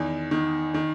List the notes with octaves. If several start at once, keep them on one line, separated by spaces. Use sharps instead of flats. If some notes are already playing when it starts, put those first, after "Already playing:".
Already playing: E2 D#3
D#3
D#3